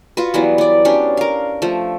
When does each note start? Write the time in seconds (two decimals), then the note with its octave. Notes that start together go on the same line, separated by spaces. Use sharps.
0.17 F4 F#4 B4
0.34 E3 F#3 G3 B3
0.58 B3 D5
0.85 F#3 C#4 D4 G4
1.17 A#4 F5
1.62 F3 A3